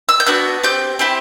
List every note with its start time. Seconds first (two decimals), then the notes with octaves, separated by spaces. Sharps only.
0.09 E6
0.20 G6
0.26 B3 D4 F#4 F#6
0.63 C4 G4 G6
0.99 C4 E4 G4